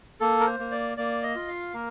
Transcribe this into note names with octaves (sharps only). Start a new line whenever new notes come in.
A#3 A4
A#4
C5
A#3
D5
A#3 D5
D#5
F4
F5
A#3 A#4